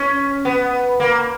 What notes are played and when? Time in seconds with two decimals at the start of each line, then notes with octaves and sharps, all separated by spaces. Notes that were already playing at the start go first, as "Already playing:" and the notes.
Already playing: C#4
0.45 B3
1.00 A#3